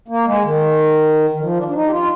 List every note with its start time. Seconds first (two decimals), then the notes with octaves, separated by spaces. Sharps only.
0.08 A#3
0.25 G#3
0.42 D#3
1.30 D#3
1.41 F3
1.57 D4
1.68 D4
1.74 D#4
1.86 G4
1.91 F4